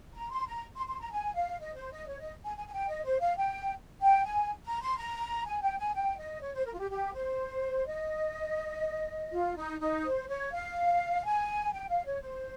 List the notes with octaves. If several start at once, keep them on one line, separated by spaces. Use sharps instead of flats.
A#5
C6
A#5
C6
C6
A#5
G#5
F5
D#5
C5
D#5
C#5
D#5
G#5
G#5
G#5
G5
D#5
C5
F5
G5
G5
G#5
A#5
C6
A#5
G#5
G5
G#5
G5
D#5
C#5
C5
A#4
F4
G4
G4
C5
D#5
F4
D#4
D#4
C5
C#5
F5
G#5
G5
F5
C#5
C5